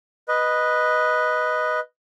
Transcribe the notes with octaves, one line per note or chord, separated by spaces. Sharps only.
B4 D#5